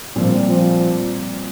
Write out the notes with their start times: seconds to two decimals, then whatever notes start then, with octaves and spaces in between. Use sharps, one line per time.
0.16 A#2 F3 G3 C4
0.47 F3